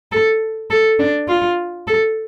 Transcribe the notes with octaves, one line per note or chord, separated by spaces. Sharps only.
A4
A4
D4
F4
A4